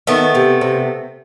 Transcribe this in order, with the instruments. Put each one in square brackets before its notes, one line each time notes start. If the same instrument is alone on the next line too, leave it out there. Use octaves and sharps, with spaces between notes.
[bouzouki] D#3 A3 B3
C3
C3